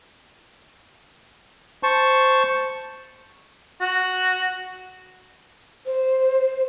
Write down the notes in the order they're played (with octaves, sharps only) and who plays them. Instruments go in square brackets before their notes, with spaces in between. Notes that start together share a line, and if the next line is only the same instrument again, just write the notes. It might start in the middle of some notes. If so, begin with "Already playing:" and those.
[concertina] C5 A5 C#6
[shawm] F#4
[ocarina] C5